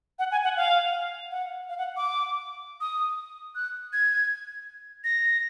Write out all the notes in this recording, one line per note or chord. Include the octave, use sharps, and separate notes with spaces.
F#5
G#5
F#5
F5
F#5
F5
F#5
D6
D#6
F#6
G#6
A#6